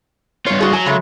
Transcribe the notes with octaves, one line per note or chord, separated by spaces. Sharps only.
G2 F4 C#5
F#4 G#4
F#3 G#5
C#3 G#3 A3